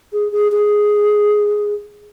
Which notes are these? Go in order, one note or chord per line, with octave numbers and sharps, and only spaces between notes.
G#4
G#4
G#4